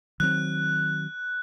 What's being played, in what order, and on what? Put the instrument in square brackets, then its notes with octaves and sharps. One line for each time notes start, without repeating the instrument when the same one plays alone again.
[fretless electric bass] D#3 F#3 C4 [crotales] F#6